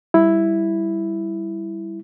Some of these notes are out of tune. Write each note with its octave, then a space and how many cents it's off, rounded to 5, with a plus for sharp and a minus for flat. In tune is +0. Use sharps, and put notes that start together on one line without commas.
G3 +0 E4 +0